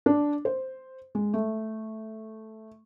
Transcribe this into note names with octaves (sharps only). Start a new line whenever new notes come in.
D4
C5
G#3
A3